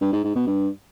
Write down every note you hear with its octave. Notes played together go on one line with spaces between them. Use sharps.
G2
G#2
G#2
B2
G2